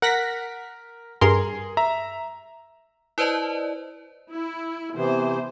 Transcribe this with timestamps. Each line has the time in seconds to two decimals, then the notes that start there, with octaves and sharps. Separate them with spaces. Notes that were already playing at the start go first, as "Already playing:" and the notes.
0.02 A#4 F#5 A#6 B6
1.21 G2 G#4 A#4 C6
1.77 E5 A#5
3.18 E4 B4 C5 D5 D#5 A5
4.30 E4
4.95 C3 E3 B3 C5